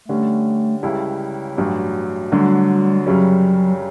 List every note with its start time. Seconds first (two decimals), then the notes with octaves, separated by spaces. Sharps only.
0.08 D3 G3 A3 C#4
0.83 C#2 C#3 G3 C#4 E4
1.57 A1 G2 F#3
2.31 D2 D3 F#3 G3
3.06 F#2 C#3 F#3 G3 C#4